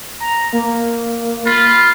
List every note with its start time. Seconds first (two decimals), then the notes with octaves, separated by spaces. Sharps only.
0.20 A#5
0.53 A#3
1.46 F4 B5